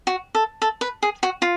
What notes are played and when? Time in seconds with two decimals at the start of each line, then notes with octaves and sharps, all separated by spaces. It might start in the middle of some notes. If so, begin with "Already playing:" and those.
0.07 F#4
0.35 A4
0.62 A4
0.81 B4
1.03 G#4
1.23 F#4
1.42 F4